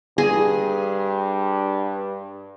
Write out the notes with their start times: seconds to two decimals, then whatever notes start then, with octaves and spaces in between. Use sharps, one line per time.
0.18 G2 G#4